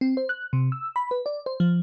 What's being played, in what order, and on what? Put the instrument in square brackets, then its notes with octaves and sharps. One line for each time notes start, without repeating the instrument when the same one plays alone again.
[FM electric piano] C4
C5
F#6
C3
E6
B5
B4
D5
C5
F3